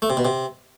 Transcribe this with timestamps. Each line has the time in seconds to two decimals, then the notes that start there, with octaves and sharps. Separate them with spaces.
0.02 A3
0.10 C3
0.17 B2
0.25 C3